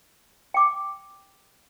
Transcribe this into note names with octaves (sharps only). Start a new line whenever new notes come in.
G5 D6